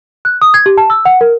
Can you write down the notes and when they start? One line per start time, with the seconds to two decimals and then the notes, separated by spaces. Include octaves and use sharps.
0.25 F#6
0.42 D#6
0.54 G#6
0.66 G4
0.78 A5
0.90 E6
1.05 F#5
1.21 A#4